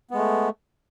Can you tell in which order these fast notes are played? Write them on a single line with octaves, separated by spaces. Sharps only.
B3 G#3 A3